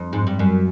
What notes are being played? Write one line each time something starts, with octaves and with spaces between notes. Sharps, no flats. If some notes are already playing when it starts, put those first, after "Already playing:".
Already playing: F2
G#2
G2
F#2